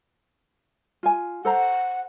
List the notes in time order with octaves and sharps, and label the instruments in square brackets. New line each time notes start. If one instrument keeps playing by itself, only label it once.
[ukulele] F4 G#5
[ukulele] A4 C5 A#5 [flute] F#5